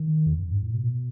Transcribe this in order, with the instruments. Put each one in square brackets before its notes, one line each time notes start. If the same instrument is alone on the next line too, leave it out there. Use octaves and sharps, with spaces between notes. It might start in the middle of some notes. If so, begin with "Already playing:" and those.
Already playing: [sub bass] D#3
E2
F#2
G#2
A2
B2